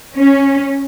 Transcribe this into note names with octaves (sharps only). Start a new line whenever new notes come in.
C#4